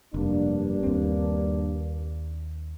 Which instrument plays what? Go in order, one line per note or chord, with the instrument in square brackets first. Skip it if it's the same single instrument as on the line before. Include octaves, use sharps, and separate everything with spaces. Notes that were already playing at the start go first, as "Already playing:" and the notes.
[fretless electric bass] F1 [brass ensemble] G2 A#3 D4
[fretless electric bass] D#2 C4